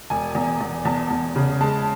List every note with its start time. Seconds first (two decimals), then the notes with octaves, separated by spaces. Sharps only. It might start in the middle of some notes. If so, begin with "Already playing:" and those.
0.10 E1 G#5
0.35 E2
0.60 E2
0.85 E2 A5
1.10 E2
1.36 C#3
1.61 G#3 A5